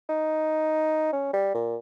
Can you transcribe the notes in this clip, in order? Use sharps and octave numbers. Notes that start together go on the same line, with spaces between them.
D#4
C#4
G3
A#2